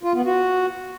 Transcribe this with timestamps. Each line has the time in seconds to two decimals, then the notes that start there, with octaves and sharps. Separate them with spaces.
0.03 F4
0.14 B3
0.25 F#4